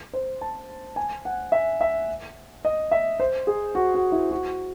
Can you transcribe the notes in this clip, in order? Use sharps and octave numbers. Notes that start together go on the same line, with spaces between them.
C5
A5
G#5
F#5
E5
E5
D#5
E5
C5
G#4
F#4
F#4
E4
F#4